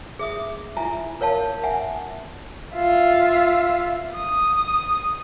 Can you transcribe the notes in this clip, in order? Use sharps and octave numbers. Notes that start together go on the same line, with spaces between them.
G#4 E5 D#6
E4 F4 E5 G#5 A#5
A#4 C#5 F5 A5
E5 F#5 G#5
F4 E5
D#6